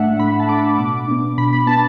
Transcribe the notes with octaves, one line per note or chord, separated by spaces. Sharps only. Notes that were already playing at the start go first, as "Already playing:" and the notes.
Already playing: A2 A3 D4 E5 F#5
A2 B5
A5
A3 D4 D6
B5
B2 D6
B3 D4
B2 B5
B5
B3 D4 A5